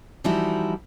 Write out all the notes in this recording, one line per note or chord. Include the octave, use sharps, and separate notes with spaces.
E3 F3 G3 D#4 E4 F#4